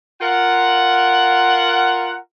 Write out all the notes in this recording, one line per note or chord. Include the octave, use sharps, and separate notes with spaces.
F4 A#4 F#5